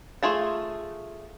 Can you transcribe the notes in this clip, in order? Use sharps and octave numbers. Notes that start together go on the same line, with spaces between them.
A3 F4 G#4 A5